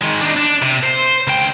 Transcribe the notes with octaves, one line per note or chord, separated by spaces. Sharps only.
D#3 G#3
D4 D#4
D4
C3
C5
C#2 G5